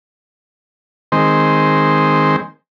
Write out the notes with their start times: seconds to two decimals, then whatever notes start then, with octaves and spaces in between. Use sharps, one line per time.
1.12 D#3 G#3 C4 C5